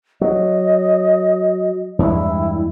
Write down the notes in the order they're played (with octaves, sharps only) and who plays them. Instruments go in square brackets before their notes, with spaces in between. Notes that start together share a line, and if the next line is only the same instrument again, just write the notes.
[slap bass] F#3 [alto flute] D#5
[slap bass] E2 G2 G#3 [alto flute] E4